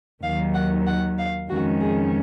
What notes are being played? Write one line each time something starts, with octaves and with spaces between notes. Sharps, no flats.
D#2 D#3 F#3 F5
F#5
F#5
F5
F2 D#3 G#3 C#4 F#4
G#4